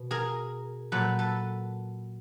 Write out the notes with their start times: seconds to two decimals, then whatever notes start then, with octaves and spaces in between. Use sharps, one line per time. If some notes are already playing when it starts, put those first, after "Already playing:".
Already playing: B2
0.11 G#4 A#4
0.92 A#2 F#3 A4 B4
1.19 A4 B4